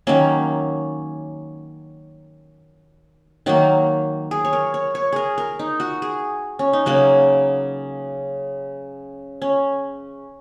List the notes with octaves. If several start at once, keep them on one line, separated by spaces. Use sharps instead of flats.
D#3 F#3 A#3 C#4
D#3 F#3 A#3 F#4
G#4
C#5
A#4
C#5
C#5
G#4 A#4
A#4
D#4
F#4
G#4
C#4
D#4
C#3 F#3 A#3 F#4
C#4